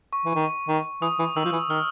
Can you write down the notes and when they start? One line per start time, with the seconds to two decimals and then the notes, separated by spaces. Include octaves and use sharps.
0.13 C#6
0.25 E3
0.35 D#3
0.68 D#3
1.02 E3 D#6
1.19 E3
1.36 D#3 E6
1.45 F3
1.52 E3
1.69 D#3 F6